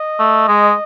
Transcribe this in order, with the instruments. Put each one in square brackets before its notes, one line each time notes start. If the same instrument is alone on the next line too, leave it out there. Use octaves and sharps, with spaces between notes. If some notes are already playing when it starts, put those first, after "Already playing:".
Already playing: [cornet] D#5
[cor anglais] A3
G#3